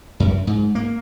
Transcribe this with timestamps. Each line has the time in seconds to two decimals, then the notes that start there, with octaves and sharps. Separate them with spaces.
0.20 F#2
0.47 G#2
0.75 A#3